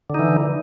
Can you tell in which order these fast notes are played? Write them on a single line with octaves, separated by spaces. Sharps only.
D3 D#4 E3